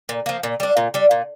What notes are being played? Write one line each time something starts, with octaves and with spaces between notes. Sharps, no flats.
A#2
F3 A#3
A#2
G3 D4
A#2
G3 D4
A#2